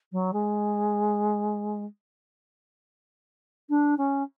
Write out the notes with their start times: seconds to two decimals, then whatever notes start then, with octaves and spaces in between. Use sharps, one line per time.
0.12 F#3
0.33 G#3
3.69 D4
3.98 C#4